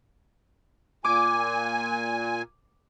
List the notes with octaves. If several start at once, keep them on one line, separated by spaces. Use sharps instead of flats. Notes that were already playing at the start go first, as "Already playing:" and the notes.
A#2 G#5 D6